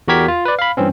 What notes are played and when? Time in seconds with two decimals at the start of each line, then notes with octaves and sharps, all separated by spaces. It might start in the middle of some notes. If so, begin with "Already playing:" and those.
0.08 E2 F#4 G4 A#4 G#6 B6
0.28 F4
0.45 B4 D5
0.59 F5 B5
0.77 G2 E3 C4 C#4